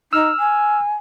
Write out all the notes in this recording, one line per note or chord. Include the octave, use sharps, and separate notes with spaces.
D#4 E6 F6
G#5